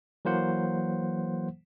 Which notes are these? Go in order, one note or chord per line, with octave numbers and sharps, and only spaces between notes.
E3 F#3 A#3 C5 F#5